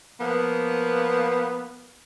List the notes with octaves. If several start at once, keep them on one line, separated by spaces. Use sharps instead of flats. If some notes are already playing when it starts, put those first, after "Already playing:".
F3 A#3 B3